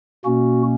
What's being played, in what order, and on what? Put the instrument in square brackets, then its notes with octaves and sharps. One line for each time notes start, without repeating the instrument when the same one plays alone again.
[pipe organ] B2 A#3 C#4 F#4